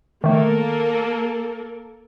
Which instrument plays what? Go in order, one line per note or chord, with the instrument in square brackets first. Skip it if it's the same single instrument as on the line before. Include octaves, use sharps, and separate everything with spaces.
[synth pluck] D#3 A3 [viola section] A#3 A4 A#4